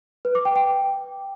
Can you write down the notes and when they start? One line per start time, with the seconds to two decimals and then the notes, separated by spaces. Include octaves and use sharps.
0.25 B4
0.35 D6
0.45 G5
0.56 G5